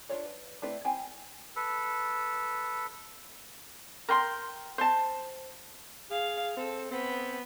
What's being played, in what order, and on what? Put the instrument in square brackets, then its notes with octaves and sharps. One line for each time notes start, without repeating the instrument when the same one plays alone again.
[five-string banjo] D4 F4 C#5 D5
B4
A3 C4 E4 B4 D5
C4 E4 G5 G#5
[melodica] A4 B4
[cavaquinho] A#4 G5 C6
C5 A5
[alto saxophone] G#4 [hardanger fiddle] F5
[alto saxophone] C4 [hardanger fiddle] A4
[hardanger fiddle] B3 [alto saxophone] C4